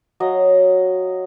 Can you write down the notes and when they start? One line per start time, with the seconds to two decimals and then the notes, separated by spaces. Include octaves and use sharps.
0.20 F#3 D#5 F5